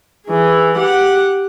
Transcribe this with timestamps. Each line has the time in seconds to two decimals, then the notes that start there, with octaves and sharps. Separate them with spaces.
0.28 E3 G#4
0.78 G4 F#5